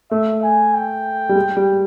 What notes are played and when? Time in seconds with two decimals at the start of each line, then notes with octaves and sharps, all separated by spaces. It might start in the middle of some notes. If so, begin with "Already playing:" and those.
0.11 A3 E5
0.43 G#5
0.74 G5
1.29 G3
1.35 G#3
1.57 G3